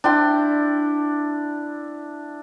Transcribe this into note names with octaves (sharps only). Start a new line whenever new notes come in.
D4 E4 G5 C6